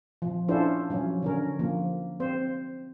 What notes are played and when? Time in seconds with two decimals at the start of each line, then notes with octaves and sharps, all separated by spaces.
0.22 F3
0.48 C#4 D4 E4 F4 A4 C5
0.90 F3 F#3 C#4
1.22 D3 C#4 A#4
1.59 F3 A#3
2.20 C4 C5